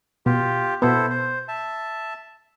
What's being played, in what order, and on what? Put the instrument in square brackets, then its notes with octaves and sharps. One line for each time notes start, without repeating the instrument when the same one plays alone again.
[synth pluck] B2 [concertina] F4 G4
[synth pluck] B2 B3 [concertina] E4 A4 C5
[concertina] C5
E5 A5